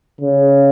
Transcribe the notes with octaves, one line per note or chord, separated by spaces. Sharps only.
C#3